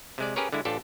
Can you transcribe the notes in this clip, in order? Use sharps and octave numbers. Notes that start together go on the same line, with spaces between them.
C3 G#3 D5
C#4 G4 G#4 A#4 B4 C#5
D3 G#3 E4
A1 D4 F4 G4 A4